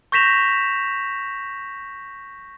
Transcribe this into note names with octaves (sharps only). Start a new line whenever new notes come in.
C#6 G6 A#6 B6 E7 F7